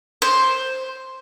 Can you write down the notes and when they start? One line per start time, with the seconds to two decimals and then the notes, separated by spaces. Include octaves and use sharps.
0.22 C5